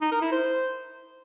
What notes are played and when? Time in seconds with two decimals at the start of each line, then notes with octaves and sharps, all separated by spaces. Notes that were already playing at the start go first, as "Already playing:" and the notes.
0.01 D#4
0.11 A#4
0.21 E4
0.32 C5